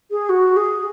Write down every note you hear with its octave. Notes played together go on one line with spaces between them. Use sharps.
G#4
F#4
G#4